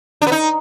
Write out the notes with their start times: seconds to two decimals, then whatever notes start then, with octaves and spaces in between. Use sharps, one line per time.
0.22 D4
0.27 B3
0.32 D#4